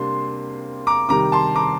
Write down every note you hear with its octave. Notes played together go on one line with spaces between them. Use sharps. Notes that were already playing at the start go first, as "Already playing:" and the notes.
Already playing: C3 G3 A#3 D4 C6
A#5 D6
C3 D#3 G3 A#5 D6
A5 C6
A#5 D6